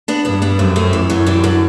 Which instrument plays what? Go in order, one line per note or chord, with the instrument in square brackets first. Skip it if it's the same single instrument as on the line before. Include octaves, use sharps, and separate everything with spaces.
[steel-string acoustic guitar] B3 D4
[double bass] G2 [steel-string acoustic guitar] B3 D4
[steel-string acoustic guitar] B3 D4
[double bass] F#2 [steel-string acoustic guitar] A3 C4
[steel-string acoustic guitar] A3 C4
[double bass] F#2 [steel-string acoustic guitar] E3
[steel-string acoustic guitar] F#3 A3
E3 G3
D3 F#3